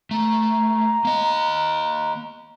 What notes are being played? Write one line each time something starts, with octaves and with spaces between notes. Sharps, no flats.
A3 A#5
A#3 D#5